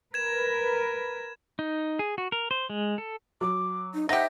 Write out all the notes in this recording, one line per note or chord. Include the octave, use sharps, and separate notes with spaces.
A#4 B4 G#6 E7
D#4
G#4
F#4
A#4
C5
G#3
A4
F#3 D6
D#4
D#4 G4 C5 E5 F#5 A#6